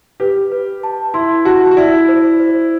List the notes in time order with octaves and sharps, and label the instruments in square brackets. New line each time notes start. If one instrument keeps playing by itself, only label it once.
[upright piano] G4 [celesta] B4
[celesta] B4
A5
[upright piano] E4 [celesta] C6
[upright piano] F#4 [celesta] A5
[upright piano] F#4
[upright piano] E4 [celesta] D5
[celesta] C5
C5